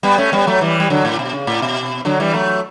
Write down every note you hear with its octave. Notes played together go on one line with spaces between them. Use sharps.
G3 B3
A3 C#4
G3 B3
F#3 A3
E3 G3
G3
D3 F#3
A2
B2
C#3
A2
B2
D3 F#3
E3 G3
F#3 A3